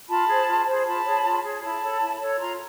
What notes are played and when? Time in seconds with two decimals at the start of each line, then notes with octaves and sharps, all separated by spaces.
0.08 F4 A5 B5
0.28 G#4 C5
0.47 F4
0.66 G#4 C5
0.86 F4 A5 B5
1.05 G#4 C#5
1.24 F4
1.44 G#4 C#5
1.63 E4 A5 B5
1.82 A4 C#5
2.01 E4
2.21 A4 C#5
2.40 F4 A#5 C6